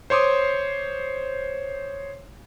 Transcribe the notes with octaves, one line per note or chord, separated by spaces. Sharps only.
C5 C#5 C6 D6 D#6